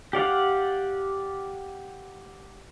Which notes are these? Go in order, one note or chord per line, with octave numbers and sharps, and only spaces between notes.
G4 D5 F5 F#5